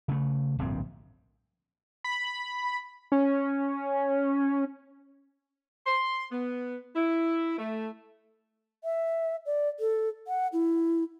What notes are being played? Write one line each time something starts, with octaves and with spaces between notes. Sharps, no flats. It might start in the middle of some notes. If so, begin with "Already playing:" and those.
C#3 A3
D1 A#1 G2 C4
B5
C#4
C6
B3
E4
A3
E5
D5
A4
F#5
E4